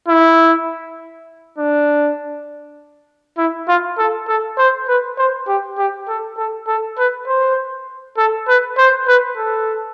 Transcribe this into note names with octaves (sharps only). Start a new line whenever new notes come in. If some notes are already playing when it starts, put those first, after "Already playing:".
E4
D4
E4
F4
A4
A4
C5
B4
C5
G4
G4
A4
A4
A4
B4
C5
A4
B4
C5
B4
A4